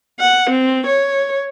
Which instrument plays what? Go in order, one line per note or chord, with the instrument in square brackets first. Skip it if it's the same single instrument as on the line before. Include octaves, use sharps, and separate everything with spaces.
[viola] F#5
C4
C#5